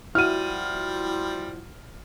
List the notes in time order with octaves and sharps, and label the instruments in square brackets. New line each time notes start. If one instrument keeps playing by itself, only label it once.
[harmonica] F3 G3 [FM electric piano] E4 F#4 [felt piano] F6 D#7